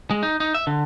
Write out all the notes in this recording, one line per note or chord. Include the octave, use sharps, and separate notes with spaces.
G#3
D#4
D#4
E5
D3